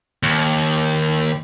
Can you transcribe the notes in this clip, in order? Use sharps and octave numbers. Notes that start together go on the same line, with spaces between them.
D#2